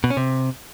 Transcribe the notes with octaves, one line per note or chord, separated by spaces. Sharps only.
B2
C#4
C3